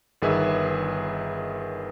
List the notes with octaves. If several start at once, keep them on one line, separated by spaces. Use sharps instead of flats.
G1 D#3 G#4 B4 E5 E6